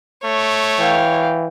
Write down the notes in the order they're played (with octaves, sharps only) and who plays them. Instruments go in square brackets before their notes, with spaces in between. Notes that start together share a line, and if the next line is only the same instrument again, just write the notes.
[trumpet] A3 [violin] C#5
[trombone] E3 [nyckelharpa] F5 G5